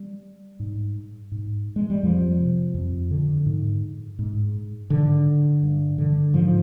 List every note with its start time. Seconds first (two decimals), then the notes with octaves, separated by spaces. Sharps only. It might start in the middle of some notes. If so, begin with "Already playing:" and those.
Already playing: G3
0.60 G#2
1.32 G#2
1.76 G#3
1.90 G3
2.03 F2 F3
2.40 C3
2.74 F2
3.11 D3
3.46 G#2
4.19 G#2
4.90 G#2 D3
5.63 G2
5.98 D3
6.34 G#2 F3